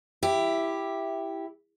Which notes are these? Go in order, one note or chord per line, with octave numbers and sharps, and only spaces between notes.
E4 G4